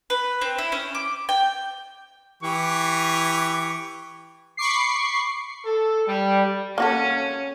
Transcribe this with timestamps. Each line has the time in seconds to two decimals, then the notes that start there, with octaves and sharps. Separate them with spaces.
0.10 B4
0.41 C4
0.58 E4
0.72 C#4
0.95 D6
1.29 G5
2.43 E3 G4 C#6
4.57 B5 C#6 D6 C7
5.66 A4
6.07 G3
6.78 A#3 C#4 F#4 A4